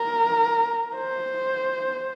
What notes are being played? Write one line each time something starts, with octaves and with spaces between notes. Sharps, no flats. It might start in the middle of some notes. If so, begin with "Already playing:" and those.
Already playing: A#4
C5